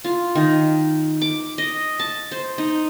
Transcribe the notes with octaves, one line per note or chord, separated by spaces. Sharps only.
F4
D#3
D6
D#5
A5
C5
D#4